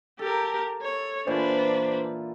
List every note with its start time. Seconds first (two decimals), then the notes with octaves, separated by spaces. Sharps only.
0.19 G4 A4 A#4
0.82 C#5
1.27 A#2 E3 D4 B4 C5